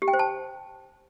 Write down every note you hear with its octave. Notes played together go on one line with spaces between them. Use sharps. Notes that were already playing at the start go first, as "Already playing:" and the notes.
G4
G5
C5
A5